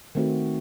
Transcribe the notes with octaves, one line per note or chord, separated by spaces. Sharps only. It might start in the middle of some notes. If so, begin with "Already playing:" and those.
D#3 A3 C4 F#4